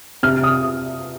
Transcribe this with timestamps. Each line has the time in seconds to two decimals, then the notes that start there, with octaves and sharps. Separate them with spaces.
0.23 C3 F6
0.44 D#6